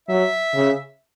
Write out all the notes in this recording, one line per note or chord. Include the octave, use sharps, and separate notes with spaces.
F#3 E5
C#3